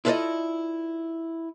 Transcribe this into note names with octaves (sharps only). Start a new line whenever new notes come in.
E4 F4 A4 B4 D5 D#5